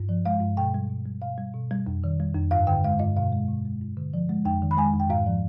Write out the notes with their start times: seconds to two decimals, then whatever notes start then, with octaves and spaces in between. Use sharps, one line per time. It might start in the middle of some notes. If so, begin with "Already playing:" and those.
Already playing: G2
0.09 F3
0.26 G#3 F5
0.41 G2
0.57 B2 G5
0.74 G3
0.90 B2
1.06 G3
1.22 B2 F5
1.38 G3
1.54 B2
1.71 G3
1.86 F2
2.04 D#3
2.20 G3
2.35 F2
2.51 G2 F5
2.67 D3 G5
2.84 G#3 F5
2.99 G2 D#5
3.17 B2 F5
3.32 G#3
3.48 B2
3.65 G#3
3.81 G2
3.97 D3
4.14 F3
4.29 G#3
4.45 F2 G5
4.62 D#3
4.71 B5
4.78 G#3 G#5
4.94 F2
5.00 G5
5.10 G#2 F5
5.26 F3